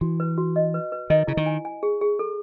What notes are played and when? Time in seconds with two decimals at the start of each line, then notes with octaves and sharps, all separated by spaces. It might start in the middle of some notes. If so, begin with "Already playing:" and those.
0.01 E3 F#4
0.20 B4
0.38 F#4
0.56 D#5
0.74 B4
0.92 B4
1.10 D#3 D#5
1.27 C#3 E4
1.37 D#3
1.46 G#5
1.65 G#5
1.83 G#4
2.01 G#4
2.19 A4